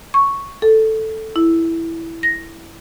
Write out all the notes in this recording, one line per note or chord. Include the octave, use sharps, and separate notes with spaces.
C#6
A4
E4
A#6